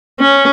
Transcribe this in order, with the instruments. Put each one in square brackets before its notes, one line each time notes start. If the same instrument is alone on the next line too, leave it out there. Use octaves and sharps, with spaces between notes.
[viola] C#4